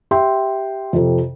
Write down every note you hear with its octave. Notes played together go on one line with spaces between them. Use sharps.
G4 E5 G5 C6
F2 C3 A4